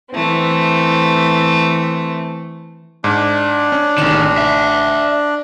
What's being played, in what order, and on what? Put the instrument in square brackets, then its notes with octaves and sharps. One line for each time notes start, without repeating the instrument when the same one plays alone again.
[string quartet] E3 A3 C4
[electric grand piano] G#2 [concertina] D4
[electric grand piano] C#4
[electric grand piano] A1 E7 [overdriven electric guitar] C3 D#3
[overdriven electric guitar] D5 E5